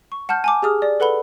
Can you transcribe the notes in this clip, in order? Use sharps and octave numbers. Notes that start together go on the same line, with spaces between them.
C#6
F#5 A5 F6 G6
G#5 A5 D6
G4 G#4 D#6 F6
D5
A4 B4 F#5 B5 G7